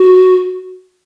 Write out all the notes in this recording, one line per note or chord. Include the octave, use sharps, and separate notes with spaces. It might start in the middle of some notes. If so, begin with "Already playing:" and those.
Already playing: F#4